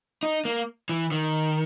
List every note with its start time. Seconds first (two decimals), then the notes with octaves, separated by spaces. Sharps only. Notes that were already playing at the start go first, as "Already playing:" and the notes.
0.23 D#4
0.45 A#3
0.89 E3
1.12 D#3